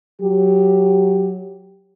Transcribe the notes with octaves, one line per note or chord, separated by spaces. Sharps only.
F#3 G4